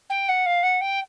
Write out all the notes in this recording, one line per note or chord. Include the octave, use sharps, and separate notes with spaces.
G5
F#5
F5
F#5
G5